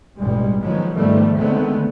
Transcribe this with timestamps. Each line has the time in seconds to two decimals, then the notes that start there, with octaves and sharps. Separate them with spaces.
0.18 A1 G2 B2 G3 G#3
0.60 D#3 F3 F#3 G#3 B3
0.94 G#2 D#3 F3 G3 A3 B3
1.37 D3 D#3 G#3 A3 B3 C4